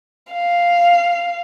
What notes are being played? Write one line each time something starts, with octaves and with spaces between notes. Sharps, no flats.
F5